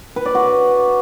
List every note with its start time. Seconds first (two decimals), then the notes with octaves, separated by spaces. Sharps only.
0.16 B4
0.26 D5
0.35 F#4